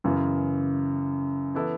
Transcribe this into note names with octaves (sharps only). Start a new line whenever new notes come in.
F#2 C#3 E3 B3
E3 B3 E4 A4